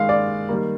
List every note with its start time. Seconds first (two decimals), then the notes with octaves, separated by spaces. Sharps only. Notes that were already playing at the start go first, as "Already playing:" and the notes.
Already playing: D#3 G#3 F5
0.09 D5
0.49 D#3 G3 A#3